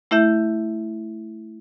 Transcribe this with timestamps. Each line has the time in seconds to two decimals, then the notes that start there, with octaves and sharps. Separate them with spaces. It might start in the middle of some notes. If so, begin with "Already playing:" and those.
0.11 A3 E4 E5 G6